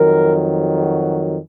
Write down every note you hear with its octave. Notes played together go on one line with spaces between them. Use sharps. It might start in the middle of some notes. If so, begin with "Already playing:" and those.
Already playing: F2 D#3 F#3 A#4
F#4